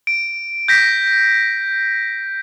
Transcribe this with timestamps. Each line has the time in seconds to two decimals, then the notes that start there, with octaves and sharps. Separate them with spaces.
0.07 D7
0.68 G6 A#6 B6